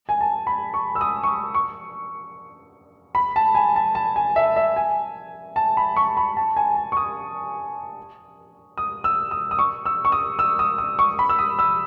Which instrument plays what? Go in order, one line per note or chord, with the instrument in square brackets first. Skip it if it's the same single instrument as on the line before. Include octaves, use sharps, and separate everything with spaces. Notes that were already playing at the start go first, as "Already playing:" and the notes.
[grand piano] G#5
A5
B5
C#6
E6
D#6
C#6
D#6
C#6
B5
A5
G#5
A5
A5
G#5
E5
E5
G#5
A5
B5
C#6
B5
A5
G#5
A5
C#6
D#6
D#6
E6
D#6
D#6
C#6
E6
C#6
D#6
E6
D#6
D#6
C#6
B5
E6
D#6
E6